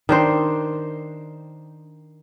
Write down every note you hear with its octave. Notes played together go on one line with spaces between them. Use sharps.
D#3 D4 C5